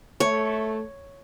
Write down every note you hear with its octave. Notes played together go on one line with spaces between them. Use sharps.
A3 C#5